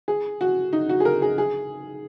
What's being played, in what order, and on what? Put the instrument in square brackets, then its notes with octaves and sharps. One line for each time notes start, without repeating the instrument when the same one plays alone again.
[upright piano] G#4
F#4
D#4
F#4
G#4
A#4
G#4
G#4